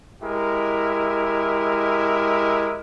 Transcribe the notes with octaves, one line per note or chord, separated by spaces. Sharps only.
G#3 E4 G4 A#4